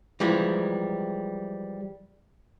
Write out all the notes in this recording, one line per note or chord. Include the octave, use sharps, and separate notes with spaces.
E3 F3 G3 G#3